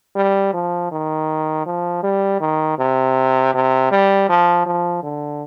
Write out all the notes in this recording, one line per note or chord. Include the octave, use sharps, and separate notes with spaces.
G3
F3
D#3
F3
G3
D#3
C3
C3
G3
F3
F3
D3